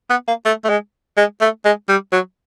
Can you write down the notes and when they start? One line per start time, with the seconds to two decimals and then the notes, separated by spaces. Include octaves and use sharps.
0.10 B3
0.27 A#3
0.45 A3
0.64 A3
0.69 G#3
1.17 G#3
1.41 A3
1.64 G#3
1.88 G3
2.12 F#3